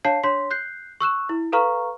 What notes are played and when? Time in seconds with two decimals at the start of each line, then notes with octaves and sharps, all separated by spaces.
0.05 D4 C#5 F5 A5 C7
0.24 D4 C#5 C6 B6
0.51 F#6 G6 C7
1.00 C#6 E6 F#6 E7
1.29 E4
1.52 A4 B4 F5 A#5 C#6 F6